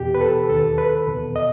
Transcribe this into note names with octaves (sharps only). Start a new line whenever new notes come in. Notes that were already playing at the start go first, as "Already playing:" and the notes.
Already playing: E2 B2 G4
B4
A4
D#2 D#3 A4
B4
E2 B2
D#5